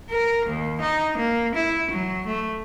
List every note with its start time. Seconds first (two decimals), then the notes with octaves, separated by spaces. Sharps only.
0.11 A#4
0.46 D#2
0.81 D#4
1.18 A#3
1.55 E4
1.91 F#3
2.26 A3